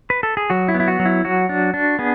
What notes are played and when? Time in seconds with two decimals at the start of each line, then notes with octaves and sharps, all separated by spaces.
0.10 B4
0.23 A4
0.37 G#4
0.50 F#3 F#4
0.68 E4
0.74 B3
0.80 E4
0.88 F#4
0.99 F#3
1.06 E4
1.25 F#3 F#4
1.49 D4
1.74 D4
1.99 B3 G#4